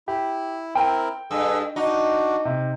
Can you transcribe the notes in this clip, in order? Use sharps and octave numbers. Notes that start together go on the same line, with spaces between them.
E4 G4
C4 E4 A#4 G5
G2 G#4 A4 E6
D4 D#4 F#4
C3